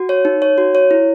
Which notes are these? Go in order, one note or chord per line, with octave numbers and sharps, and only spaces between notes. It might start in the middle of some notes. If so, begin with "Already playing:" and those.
Already playing: F#4
C#5
D#4
C#5
F#4
C#5
E4